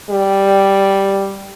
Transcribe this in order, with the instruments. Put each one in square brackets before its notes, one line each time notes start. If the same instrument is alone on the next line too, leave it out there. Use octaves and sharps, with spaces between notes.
[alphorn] G3